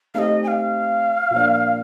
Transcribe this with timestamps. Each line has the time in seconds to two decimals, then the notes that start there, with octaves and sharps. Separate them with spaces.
0.14 A3 C4 D#4 G4 D#5 F5
0.44 G#5
0.48 F5
1.31 A#2 F3 A#3 D4